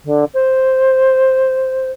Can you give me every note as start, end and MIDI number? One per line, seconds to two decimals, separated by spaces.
0.04 0.24 50
0.34 1.90 72